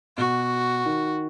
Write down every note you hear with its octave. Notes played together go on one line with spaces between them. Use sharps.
B2 F#4
D#3